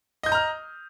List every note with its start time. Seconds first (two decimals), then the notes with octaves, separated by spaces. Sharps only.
0.23 D#5
0.26 G6
0.29 D#6
0.32 A#5
0.34 F6